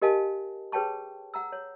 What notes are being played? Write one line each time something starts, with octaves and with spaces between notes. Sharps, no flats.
G4 A#4 D#5 F5 G#5 A5
G#4 B4 C#5 G5 A5 C#6
F#5 A#5 E6
C#5